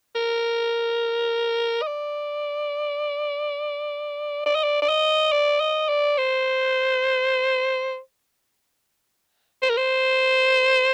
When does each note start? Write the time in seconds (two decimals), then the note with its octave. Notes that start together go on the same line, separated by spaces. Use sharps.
0.16 A#4
1.82 D#5
1.87 D5
4.46 D5
4.55 D#5
4.64 D5
4.82 D5
4.89 D#5
5.32 D5
5.60 D#5
5.89 D5
6.18 C5
9.62 C5
9.70 A#4
9.77 C5